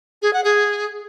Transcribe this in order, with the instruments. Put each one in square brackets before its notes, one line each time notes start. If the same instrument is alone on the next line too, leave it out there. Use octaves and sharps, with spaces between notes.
[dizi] G#4
F#5
G#4